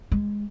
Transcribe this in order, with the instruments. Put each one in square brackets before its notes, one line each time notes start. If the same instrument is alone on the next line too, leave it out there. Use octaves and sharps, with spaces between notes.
[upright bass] G#3